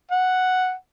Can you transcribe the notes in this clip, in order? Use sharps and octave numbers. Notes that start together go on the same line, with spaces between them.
F#5